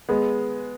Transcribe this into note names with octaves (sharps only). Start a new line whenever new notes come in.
G#3 B3